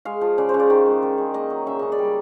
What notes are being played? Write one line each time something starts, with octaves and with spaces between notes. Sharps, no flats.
G#3 F5
F3
C#3 D5
C5
C#3
D5
D#3
G#3
D#3
G#3
A#3 D#5
F#3
C#3 E5
C#3 D#5
D5
G3
D#5